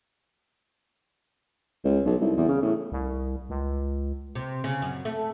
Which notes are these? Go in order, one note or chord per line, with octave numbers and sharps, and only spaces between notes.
C#2
B1
C2
E2
C#3
A2
C2
C#2
C3
C#3
F#2
A3